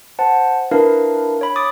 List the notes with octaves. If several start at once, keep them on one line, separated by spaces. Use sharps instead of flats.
C5 F#5 A5
D4 E4 A#4 B4 F5
C#5 B5
D6 D#6 A6